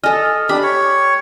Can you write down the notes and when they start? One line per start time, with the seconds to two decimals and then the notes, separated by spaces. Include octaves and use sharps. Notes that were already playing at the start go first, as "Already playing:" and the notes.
0.04 A4 D#5 G#5 F6
0.49 D4 G4 B5
0.63 C#5